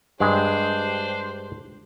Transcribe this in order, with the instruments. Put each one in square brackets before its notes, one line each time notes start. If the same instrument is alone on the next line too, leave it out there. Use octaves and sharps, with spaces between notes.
[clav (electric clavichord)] G2 G#3 [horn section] D4 G4 C5